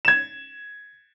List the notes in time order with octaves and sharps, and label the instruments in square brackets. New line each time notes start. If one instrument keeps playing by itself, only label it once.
[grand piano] G#6 E7